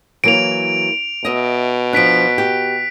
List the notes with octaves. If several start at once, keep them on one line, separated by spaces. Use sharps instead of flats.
E3 F#3 A#3 D7 F7
B2 D#5 E5
F3 D4 F#6 B6 D7
G4